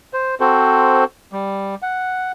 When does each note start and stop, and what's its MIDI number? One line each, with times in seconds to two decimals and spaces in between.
0.13 0.35 72
0.40 1.04 60
0.40 1.04 66
0.40 1.04 69
0.40 1.04 72
1.33 1.75 55
1.82 2.32 78